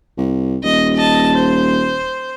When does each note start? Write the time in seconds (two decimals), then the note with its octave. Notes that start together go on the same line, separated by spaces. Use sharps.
0.18 C2
0.63 D#1 D#5
0.96 D#5 A5
1.34 C5